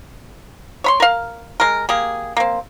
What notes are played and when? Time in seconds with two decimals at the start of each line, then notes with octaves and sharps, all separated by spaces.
0.84 C#5 B5 C6
1.00 A#4 F5
1.60 G#3 A#4
1.89 A#3 G4 G#4
2.37 A#3 C4